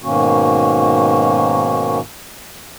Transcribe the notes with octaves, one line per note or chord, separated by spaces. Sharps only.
G#2 B2 D#3 A#3 C#4 F#4